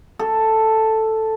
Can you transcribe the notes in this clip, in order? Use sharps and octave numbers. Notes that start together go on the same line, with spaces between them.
A4